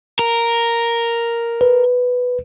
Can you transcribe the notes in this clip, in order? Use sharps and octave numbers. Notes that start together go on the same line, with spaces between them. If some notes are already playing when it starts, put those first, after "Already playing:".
A#4
B4